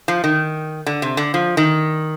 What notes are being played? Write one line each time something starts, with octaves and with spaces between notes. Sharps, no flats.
F3
D#3
D3
C3
D3
F3
D#3